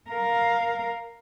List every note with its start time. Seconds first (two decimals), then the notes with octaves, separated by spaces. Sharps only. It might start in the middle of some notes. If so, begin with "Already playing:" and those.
0.10 A#4 F5